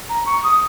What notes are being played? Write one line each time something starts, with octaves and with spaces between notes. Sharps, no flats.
A#5
C#6
D#6